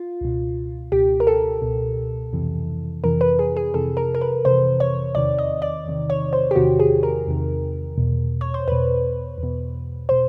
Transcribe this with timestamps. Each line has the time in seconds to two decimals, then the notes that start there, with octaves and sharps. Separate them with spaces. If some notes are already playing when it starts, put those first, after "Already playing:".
Already playing: F4
0.21 C#2 B2
0.92 C#2 B2 G4
1.20 A#4
1.27 A4
1.62 C#2 B2
2.33 F2 C3 E3
3.04 F2 C3 E3 A#4
3.21 B4
3.39 G#4
3.57 G#4
3.74 F2 C3 E3 A4
3.97 A#4
4.15 A#4
4.21 B4
4.44 F2 C3 E3 C5
4.80 C#5
5.15 E2 C3 D#3 D5
5.38 D#5
5.62 D5
5.86 E2 C3 D#3
6.10 C#5
6.33 C5
6.51 G4
6.56 E2 C3 D#3 F#4
6.79 G#4
7.03 A#4
7.27 E2 C3 D#3
7.98 E2 B2
8.41 C#5
8.54 C5
8.68 E2 B2 B4
9.38 E2
9.43 B2
10.09 B2 C5